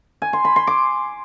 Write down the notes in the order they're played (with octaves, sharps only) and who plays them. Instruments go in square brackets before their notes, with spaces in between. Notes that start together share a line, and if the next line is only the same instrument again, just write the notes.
[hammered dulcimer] G#5
C6
B5
C6
D6